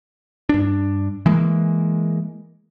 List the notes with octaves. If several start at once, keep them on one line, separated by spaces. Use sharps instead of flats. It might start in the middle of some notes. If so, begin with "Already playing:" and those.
G2 D4
E3 G#3 A#3